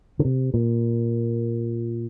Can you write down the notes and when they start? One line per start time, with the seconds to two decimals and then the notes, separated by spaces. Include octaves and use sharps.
0.19 D3
0.25 C3
0.54 A#2